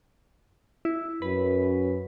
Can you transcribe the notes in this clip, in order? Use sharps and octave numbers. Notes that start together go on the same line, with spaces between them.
E4
F#2 B4